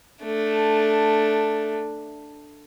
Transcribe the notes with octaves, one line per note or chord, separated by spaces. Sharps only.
A3 D4